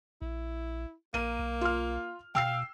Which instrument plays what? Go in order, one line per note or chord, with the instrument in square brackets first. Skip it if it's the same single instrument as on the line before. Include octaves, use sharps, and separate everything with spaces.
[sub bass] A#1 [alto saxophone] E4
[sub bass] A#1 [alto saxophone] A#3 [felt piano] A#4 D#7
[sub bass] B1
[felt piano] F4 F6
[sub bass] B2 [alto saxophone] F5 [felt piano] G5 E6 C7